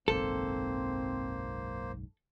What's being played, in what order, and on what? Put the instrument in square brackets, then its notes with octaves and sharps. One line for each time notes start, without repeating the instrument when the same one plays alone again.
[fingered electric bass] F#1 B1 G#2 [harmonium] A#3 C5 [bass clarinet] C4 [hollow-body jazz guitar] A4